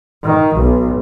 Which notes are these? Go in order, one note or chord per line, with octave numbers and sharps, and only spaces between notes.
D#3
B1